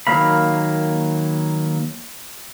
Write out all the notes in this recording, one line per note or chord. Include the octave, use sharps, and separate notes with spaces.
D#3 F#3 A#3 F5 B5